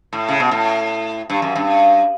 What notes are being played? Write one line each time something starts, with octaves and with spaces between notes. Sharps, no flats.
A2
C#3
B2
A2
G2
F#2
G2